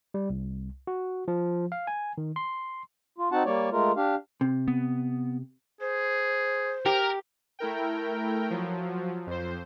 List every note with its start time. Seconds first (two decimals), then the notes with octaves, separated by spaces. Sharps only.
0.14 G3
0.30 C2
0.87 F#4
1.28 F3
1.72 F5
1.87 G#5
2.18 D#3
2.36 C6
3.18 F4
3.32 C4 D#4 F#4 F#5 A5
3.45 G3 A#3 C#5 D5
3.72 G#3 A3 F4 A#4
3.96 D4 G4 F5
4.41 C3
4.68 B3
5.81 G#4 C5
6.86 G4 A#4
7.59 A3 E4 A#4 G5
8.50 F3 F#3
9.27 F2 C5